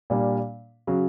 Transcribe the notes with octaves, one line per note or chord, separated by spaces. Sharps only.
A#2 G3 A#3 D4
C#3 F#3